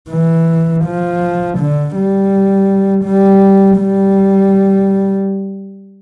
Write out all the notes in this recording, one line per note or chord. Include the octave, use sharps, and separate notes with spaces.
E3
F3
D3
G3
G3
G3